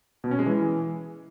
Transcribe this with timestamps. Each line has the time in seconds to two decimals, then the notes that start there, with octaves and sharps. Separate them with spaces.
0.24 B2
0.31 C#4
0.39 G#3
0.46 E3